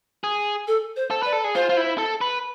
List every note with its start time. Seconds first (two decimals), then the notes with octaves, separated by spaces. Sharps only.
0.24 G#4
0.67 A4
0.96 C5
1.11 A4
1.23 B4 D5
1.33 A4
1.44 G#4
1.55 F4 C5
1.69 F4
1.77 E4
1.98 A4
2.21 B4